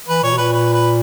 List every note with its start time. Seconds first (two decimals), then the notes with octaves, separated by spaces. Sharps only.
0.08 E3 B4
0.23 A#2 C#5
0.32 B2
0.38 A#2 B4
0.53 B4
0.73 B4